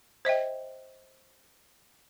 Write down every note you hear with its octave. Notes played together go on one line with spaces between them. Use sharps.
C5 D#5 E5 G5